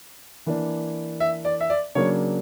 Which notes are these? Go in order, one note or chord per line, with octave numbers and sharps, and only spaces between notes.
E3 A#3 D4
E5
D5
E5
D5
C#3 F#3 A#3 D4 C#5